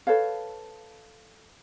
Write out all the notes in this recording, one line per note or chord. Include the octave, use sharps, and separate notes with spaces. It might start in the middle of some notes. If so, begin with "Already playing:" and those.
A4 B4 C#5 F5